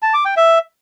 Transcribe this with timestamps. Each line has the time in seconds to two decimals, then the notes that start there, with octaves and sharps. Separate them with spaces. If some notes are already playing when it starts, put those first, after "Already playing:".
0.02 A5
0.14 D6
0.25 G5
0.37 E5